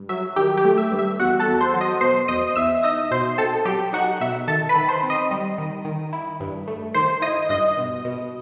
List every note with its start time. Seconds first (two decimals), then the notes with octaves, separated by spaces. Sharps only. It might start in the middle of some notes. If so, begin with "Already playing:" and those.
Already playing: G2
0.09 F#3 E5
0.36 D#3 G4 G5
0.57 G4 G5
0.64 A3
0.78 E5
0.92 G2
0.99 E5
1.19 E2 F#4 F#5
1.40 A4 A5
1.47 E2
1.60 C5 C6
1.74 F#3
1.81 D#5 D#6
2.01 B2 C5 C6
2.28 E2 D#5 D#6
2.56 E2 E5 E6
2.83 D#4 D#5 D#6
3.11 B2 C5 C6
3.38 C4 A4 A5
3.65 F#3 G4 G5
3.93 D#4 F#4 F#5
4.20 B2 E5
4.48 D#3 A4 A5
4.69 B4 B5
4.75 D#3
4.89 C5 C6
5.03 C4
5.10 D#5 D#6
5.31 G3
5.58 D#3
5.85 D#3
6.13 E4
6.40 G2
6.67 A3
6.94 D#3 C5 C6
7.22 E4 D#5 D#6
7.49 G2 D#5 D#6
7.77 B2
8.05 B2